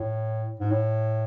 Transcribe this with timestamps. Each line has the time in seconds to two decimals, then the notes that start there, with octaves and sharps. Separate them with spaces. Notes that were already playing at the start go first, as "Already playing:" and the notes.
Already playing: A2
0.60 G#2
0.71 A2